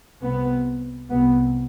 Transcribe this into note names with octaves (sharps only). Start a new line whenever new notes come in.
C2 C3 B3
C2 C3 B3